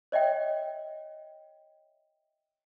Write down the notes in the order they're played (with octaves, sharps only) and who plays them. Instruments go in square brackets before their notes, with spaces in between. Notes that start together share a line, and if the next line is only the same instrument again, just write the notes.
[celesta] C#5 D#5 E5 G5